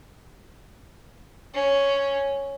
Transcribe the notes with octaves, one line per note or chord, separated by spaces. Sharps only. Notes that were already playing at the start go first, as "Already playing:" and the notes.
C#4